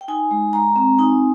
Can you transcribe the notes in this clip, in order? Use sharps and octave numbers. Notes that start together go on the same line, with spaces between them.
G5
D#4 G#5
G#3
G#3 A#5
C4
D#4 G#5